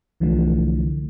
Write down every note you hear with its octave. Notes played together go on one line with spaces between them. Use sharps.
C2 D3 E3 F3 A3